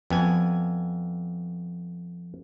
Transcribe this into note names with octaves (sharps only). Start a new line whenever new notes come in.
F2 B3 G#5